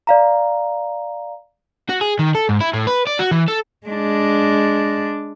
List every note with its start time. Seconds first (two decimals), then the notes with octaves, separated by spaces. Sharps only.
0.07 D5 F5 A#5
1.89 F#4
2.01 G#4
2.19 D#3
2.35 A4
2.49 G#2
2.60 E4
2.73 A2
2.87 B4
3.07 D5
3.19 F#4
3.31 E3
3.48 A4
3.87 G#3 D4